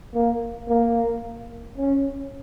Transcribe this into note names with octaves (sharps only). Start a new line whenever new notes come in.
A#3
A#3
C#4